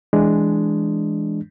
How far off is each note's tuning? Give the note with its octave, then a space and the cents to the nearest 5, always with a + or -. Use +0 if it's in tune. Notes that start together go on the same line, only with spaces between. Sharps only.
E3 +0 G#3 +0 D4 +0